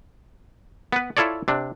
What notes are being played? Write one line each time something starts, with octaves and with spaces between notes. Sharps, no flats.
B3 B4
E4 F4 A4 C#5 D5
C3 D4